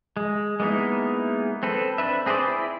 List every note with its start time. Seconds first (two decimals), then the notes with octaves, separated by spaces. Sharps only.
0.17 G#3
0.60 G#3 A#3 B3 D#4 E4
1.63 C4 A4 B4
1.98 C4 D4 B4 E5
2.26 C4 G#4 B4 C5 D5
2.48 E4